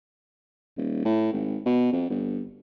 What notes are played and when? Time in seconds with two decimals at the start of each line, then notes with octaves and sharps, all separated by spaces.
0.77 D#1
1.05 A2
1.32 G#1
1.66 B2
1.93 F2
2.10 G1